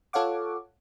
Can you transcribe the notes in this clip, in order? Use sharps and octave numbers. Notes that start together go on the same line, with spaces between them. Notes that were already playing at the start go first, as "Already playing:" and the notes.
F4 A4 C#5 F5 F#5 D6